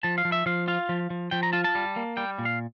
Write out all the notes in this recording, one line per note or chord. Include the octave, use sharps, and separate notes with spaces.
F3 A5
F5
F3
E5
F3 F5
F4 F5
F3
F3
F3 G5
A#5
F4 A5
A5
G3
A#3
G3 G5
A#2
F5